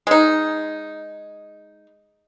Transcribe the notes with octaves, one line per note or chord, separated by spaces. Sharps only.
G#3 D#4